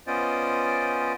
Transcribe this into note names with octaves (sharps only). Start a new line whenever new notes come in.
B3 C#4 F4 C5 D5 D#5